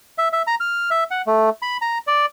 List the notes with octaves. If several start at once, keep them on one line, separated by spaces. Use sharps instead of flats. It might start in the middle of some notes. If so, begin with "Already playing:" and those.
E5
E5
A#5
F6
E5
F#5
A3
B5
A#5
D5